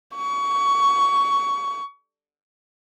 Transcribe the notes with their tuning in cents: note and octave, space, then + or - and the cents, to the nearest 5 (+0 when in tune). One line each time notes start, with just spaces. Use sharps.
C#6 +20